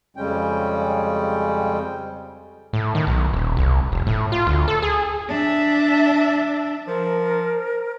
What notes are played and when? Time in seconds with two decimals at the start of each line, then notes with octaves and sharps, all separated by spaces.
0.17 F2 C#3 G3 G#3 C#4 G5
2.73 A2
2.95 D#3
3.07 B1
3.34 D#1
3.57 C2
3.92 F1
4.07 A2
4.32 F4
4.47 D2
4.68 A4
4.82 G#4
5.28 D4 E5
6.87 F3 A#4